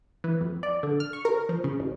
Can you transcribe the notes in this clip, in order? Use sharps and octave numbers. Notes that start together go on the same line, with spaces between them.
E3
F2
D5
D3
F6
C#6
A#4
F3
C#3
A1